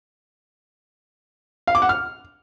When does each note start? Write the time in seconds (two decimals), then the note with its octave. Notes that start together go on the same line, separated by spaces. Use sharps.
1.67 F5
1.75 D6
1.82 F#5
1.89 F6